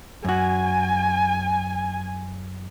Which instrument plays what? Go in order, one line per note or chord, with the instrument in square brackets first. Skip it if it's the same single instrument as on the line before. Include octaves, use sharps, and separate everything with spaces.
[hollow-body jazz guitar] F#2 F#4 [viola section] G#5